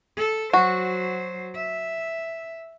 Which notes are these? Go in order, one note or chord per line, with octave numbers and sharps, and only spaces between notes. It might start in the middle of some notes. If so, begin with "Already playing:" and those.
A4
F#3 F#4 C5
E5